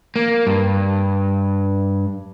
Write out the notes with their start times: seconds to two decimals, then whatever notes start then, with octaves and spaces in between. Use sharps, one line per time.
0.16 A#3
0.47 G2